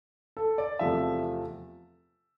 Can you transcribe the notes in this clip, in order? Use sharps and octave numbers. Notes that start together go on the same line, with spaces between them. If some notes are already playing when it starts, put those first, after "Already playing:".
A4
D5
E2 C3 F3 A3 E5